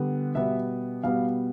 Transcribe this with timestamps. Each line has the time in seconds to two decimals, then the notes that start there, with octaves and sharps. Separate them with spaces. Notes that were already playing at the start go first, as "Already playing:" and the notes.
Already playing: D3 G3 B3
0.35 B2 G3 B3 E5
1.03 B2 G3 B3 F5